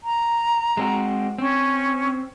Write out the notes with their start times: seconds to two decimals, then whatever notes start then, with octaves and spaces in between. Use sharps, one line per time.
0.03 A#5
0.77 G#3 C4 F#4
1.38 C4 C#4